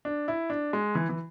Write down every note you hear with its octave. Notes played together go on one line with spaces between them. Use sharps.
D4
E4
D4
G#3
E3
E3